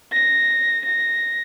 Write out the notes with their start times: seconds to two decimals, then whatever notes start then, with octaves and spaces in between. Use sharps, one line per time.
0.13 A#6
0.85 A#6